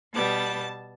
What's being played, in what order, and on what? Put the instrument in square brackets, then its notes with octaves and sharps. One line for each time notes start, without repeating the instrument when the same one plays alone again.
[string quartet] B2 G3 B3 A5